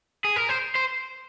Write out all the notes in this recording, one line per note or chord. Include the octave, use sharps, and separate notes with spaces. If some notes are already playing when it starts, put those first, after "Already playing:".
G#4
A#4
C5
C5